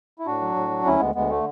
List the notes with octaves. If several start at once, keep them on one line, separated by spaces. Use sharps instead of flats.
E4
A2 D4 F#4
F#3
A2
F#3
D2 C#4 E4
D2 G#3 B3
D2 G#3 B3
D3 A3